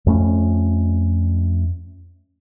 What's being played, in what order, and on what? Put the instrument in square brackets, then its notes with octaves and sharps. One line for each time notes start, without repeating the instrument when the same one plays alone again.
[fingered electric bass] F2 A3 C#4